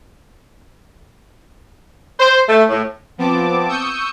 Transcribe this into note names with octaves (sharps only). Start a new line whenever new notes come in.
C5
A3
A2
F3 B3 C4 A5 D6
C#6 D#6 E6 G6 C#7